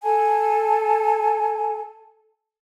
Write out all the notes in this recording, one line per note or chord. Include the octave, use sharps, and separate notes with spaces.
A4 G#5 A5